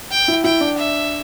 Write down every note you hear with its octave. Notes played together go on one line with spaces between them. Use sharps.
G5
E4
E4 G5
D4
E5